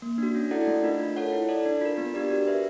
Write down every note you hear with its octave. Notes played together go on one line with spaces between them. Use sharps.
A#3
D4 F#4
C#4
E4 A4 D5 F#5
A3
D4 F4 A#4 D#5
F4
A4 C#5 F#5
E4
A4 D5
D4
F4 A#4
B3
D4 G4 A#4 D5
F#4
B4 E5